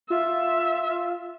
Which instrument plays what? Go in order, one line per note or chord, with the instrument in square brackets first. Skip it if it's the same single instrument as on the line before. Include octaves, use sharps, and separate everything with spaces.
[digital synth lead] F4 [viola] E5